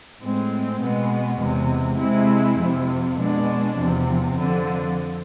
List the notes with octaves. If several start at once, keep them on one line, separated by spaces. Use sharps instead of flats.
A2 G#3 C4
B2 G#3 B3
E2 C3 G#3
C3 G#3 C4 E4
F2 C3 F3
B2 G#3 D4
E2 C3 F3
F2 D3 F3